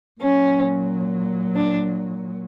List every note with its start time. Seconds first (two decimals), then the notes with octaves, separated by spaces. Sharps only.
0.20 A#2 F#3 C#4
1.56 D4